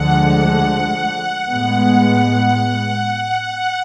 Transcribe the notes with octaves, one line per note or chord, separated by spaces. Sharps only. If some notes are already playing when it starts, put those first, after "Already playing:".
Already playing: D2 D3 F3 G#3 F#5
A2 G#3 B3